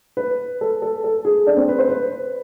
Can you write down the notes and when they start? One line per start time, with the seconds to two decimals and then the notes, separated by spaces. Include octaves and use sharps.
0.17 B4
0.61 A4
0.82 A4
1.04 A4
1.25 G#4
1.47 D4
1.57 C4
1.69 B4
1.79 C5
1.89 B4